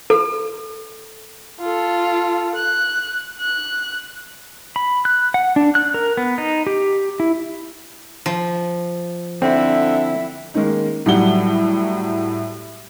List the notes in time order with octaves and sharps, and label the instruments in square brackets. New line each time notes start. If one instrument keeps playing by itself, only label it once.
[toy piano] A4
[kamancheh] F4 A4
F#6
F#6
[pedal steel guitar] B5
F#6
F#5
D4
F#6
A#4
B3
D#4
G4
E4
[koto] F3
[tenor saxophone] D3 [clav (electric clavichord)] C4 [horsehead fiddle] E4
[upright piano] D#3 G#3 A#3 C#4 D#4
A2 F#3 G3 F#5 G7